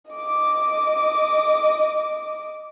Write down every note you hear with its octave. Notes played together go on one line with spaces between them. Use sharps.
D#5 D6